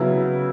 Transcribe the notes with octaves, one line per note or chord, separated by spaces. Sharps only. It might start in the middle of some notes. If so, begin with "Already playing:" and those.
Already playing: C#3 F#3 B3 E4